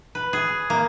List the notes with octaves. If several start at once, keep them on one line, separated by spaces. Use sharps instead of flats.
B4
G#4
A#3